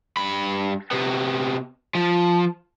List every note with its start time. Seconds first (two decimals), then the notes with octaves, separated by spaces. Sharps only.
0.17 G2 B5
0.91 C3 B3
1.95 F3